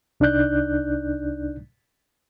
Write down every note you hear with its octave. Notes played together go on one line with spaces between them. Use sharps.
C2 D4 D#4 D5 F#6 G6